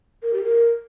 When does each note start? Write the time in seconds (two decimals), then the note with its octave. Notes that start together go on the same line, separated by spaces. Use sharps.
0.23 A#4
0.33 G4
0.44 A#4